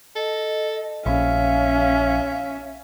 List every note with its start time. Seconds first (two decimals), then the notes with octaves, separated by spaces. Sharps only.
0.16 A4 D#5
1.06 A#1 C#4 E5 F5